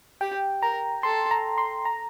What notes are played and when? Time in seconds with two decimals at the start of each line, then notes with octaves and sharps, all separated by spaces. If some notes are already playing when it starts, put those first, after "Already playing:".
0.21 G4 G5
0.62 A#4 A#5
1.03 A4 C6
1.31 A#5
1.58 C6
1.85 A#5